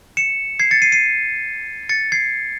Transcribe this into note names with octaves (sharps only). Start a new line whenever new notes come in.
C#7 E7
G#6 C7
A6 C#7
C7 D#7
C7 D#7
A6 C#7
G#6 C7